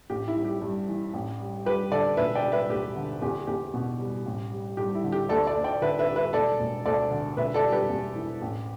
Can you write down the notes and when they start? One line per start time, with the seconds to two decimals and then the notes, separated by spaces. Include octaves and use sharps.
0.10 A1 G4
0.28 E4
0.36 G3
0.44 G4
0.62 G2
0.89 E3
1.14 A1
1.40 G3
1.65 G2 G4 B4
1.92 D3 A4 D5
2.17 E1 B4 E5
2.35 D5 G5
2.43 G3
2.52 B4 E5
2.69 D2 G4
2.96 D3
3.22 E2 G4
3.47 E2 G4
3.74 B2
3.99 G3
4.26 A1
4.52 G3
4.77 G2 G4
4.95 E4
5.04 D3
5.12 G4
5.29 D2 A4 D5
5.47 A4 D5
5.56 D2
5.64 D5 G5
5.82 D3 B4 E5
5.99 B4 E5
6.08 G3
6.16 B4 E5
6.33 E1 A4 D5
6.60 E1
6.86 D2 A4 D5
7.11 D3
7.37 E1 B4 E5
7.54 A4 D5
7.63 G3
7.72 G4 B4
7.89 E2
8.16 E3
8.42 A1